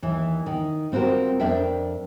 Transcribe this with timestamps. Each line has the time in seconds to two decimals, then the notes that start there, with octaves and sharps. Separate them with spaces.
0.02 D#2 E3
0.46 D#3
0.92 G3 C4 F4 F#4 A#4
1.40 F2 D4 A#4 D5 E5 G5